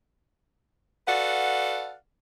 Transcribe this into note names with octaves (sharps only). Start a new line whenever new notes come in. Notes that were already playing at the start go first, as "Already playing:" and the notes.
F#4 A4 B4 D5 F5 F#5